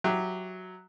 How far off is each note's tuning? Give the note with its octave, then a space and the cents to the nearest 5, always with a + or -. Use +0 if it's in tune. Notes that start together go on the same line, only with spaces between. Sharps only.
F#3 +0 G4 +0 E5 +0